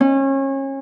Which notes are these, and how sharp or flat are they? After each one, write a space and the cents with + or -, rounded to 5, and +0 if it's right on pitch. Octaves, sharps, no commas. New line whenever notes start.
C#4 -30